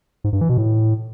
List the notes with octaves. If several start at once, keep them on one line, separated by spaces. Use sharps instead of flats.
G#2
G2
E3
B2
A2